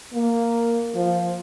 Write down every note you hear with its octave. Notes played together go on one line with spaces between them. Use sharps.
A#3
F3